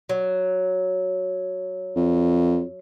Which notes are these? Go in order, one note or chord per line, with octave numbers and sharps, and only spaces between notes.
F#3
F2